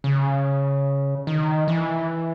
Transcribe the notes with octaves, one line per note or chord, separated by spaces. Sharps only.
C#3
D#3
E3